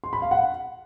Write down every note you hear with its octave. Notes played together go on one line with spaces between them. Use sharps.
C6
B5
F5
F#5